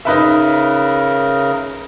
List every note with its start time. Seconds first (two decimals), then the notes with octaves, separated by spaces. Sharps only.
0.05 C#3 D#4 A#4 B4 E5